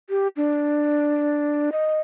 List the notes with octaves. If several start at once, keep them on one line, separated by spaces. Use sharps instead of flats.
G4
D4
D#5